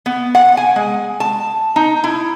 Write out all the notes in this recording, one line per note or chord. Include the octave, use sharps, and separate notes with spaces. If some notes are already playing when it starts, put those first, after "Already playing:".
B3
F#5
G#5
G#3
A5
D#4
E4